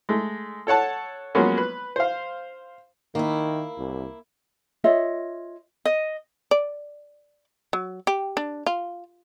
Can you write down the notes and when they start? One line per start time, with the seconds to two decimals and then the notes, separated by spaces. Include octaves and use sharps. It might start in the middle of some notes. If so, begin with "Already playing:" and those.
0.09 G#3 A3
0.67 A4 C#5 F#5 A5
1.35 F3 F#3 G#3 A#3 B3 C#4
1.58 B4
1.96 C5 F5
3.15 D#3 A#3 E4
3.78 C2
4.84 F4 C#5 D#5 E5
5.85 D#5
6.51 D5
7.73 F#3
8.07 G4
8.37 D4
8.66 F4